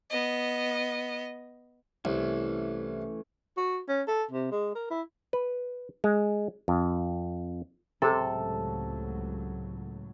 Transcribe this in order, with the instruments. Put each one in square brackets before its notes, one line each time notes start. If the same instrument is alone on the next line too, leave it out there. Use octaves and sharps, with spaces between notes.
[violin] B3 D#5
[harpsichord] C2 [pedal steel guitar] E3 A3 C#4
[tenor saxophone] F#4
C#4
A4
C3
G#3
A#4
E4
[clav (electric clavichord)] B4
G#3
F2
[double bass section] C#2 A2 F#3 [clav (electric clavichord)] C3 [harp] A4